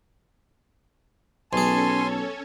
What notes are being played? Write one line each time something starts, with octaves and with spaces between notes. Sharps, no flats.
B1 C#4 G#4 A4 C#5 G#5 A5 C6